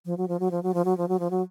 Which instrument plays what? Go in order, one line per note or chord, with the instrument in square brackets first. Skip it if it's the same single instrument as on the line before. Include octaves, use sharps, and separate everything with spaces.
[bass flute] F3
F#3
F3
F#3
F3
F#3
F3
F#3
F3
F#3
F3
F#3